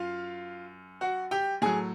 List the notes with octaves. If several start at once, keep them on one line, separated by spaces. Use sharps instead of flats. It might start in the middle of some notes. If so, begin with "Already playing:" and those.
Already playing: F#2 F4 F5
F#4 F#5
G4 G5
A2 F#3 G#4 G#5